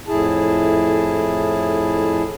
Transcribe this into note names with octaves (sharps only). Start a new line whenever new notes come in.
F2 A2 E4 G#4 A5